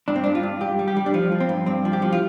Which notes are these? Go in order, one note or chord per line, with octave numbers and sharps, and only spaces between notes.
G2 D4
C4
G2 D4
F4
G2
G2 G4
G3
G4
G3
D4
F3 F4
F3
C4
G2
G2 C4
F3
G4
F3
F4